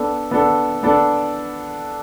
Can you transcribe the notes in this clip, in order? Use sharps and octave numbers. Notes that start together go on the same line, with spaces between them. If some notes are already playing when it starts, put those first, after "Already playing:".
Already playing: B3 D4 A4
B3 D4 A4
B3 D4 A4